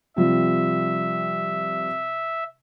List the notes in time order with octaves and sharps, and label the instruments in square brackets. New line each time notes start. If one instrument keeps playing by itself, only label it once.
[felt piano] C3 F3 G3 [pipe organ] E5